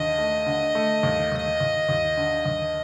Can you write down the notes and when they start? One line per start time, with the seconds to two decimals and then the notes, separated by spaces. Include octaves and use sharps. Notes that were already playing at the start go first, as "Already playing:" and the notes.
Already playing: D#2 D3 D#5
0.18 A3
0.46 D3
0.75 A3
1.03 D#2
1.32 D#2
1.60 D#2
1.89 D#2
2.17 D3
2.45 D#2